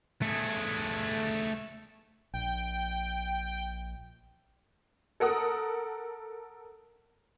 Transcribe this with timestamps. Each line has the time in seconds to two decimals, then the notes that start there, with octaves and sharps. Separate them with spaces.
0.22 A3 G#4
2.34 A#1 G5
5.20 A4 A#4 F#5 D#6